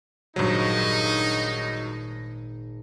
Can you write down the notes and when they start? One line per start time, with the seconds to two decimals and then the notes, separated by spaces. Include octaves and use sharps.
0.36 G#1 G2 A#2 F#3 D#4